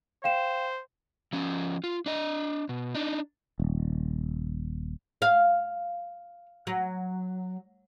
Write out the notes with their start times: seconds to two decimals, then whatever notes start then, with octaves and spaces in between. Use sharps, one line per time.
0.24 C5 F5 G5 E7
1.33 F3 C#4
1.84 F4
2.06 D4 D#5
2.69 B2
2.95 D4 D#4
3.60 D#1
5.22 F5
6.67 F#3